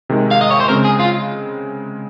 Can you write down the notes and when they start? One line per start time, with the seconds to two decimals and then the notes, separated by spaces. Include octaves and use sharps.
0.09 C3 D#3 G#3
0.31 F5
0.41 D#5
0.51 C#5
0.60 C5
0.69 C#3 G#3 C4 A#4
0.85 G#4
1.00 F4